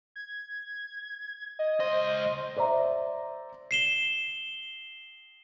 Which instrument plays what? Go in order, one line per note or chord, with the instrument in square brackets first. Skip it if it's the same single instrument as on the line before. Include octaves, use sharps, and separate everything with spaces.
[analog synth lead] G#6
D#5
[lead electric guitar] C#2 D#5 [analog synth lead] C5
[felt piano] C5 D5 E5 A#5
[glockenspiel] C7 E7 G7